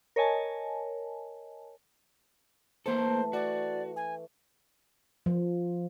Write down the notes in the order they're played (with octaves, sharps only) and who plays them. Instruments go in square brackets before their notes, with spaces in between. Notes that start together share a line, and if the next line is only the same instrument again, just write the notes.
[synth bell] A#4 C#5 D#5 G#5 A5
[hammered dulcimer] E3 A3 [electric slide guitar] A#3 A4 [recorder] C5
[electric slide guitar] F#4 [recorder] D5
[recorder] G#5
[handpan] F3